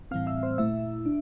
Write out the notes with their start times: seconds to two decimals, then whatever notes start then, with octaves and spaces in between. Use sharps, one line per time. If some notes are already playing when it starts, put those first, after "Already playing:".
0.11 A2 E3 G3 C4 F5 F6
0.27 E5 E6
0.43 C5 C6
0.58 A#2 A3 E4 E5 E6
1.06 D4